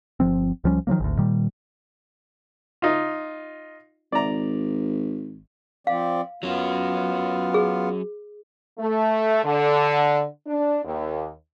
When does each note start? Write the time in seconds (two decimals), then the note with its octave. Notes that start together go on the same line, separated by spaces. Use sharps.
0.20 G1 D#2 F3 C4
0.64 C#2 F3 G3 C#4
0.87 D#3 F3 F#3 A#3
1.00 G#1 D2
1.18 A#2 D#3 G3
2.82 D#4 F4
4.12 G#1 D5 A#5
5.87 F3 C4 D5 F5
6.43 F#3 B3 C#4 F4
7.54 G#4
8.78 A3
9.44 D3
10.46 D4
10.85 D#2